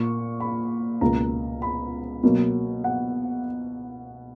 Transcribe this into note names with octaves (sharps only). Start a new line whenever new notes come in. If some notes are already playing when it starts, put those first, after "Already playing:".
Already playing: A#2 A#3 C#6
B5
C#2 B2 A#3 A#5
B5
B2 F#3 A#3
F#5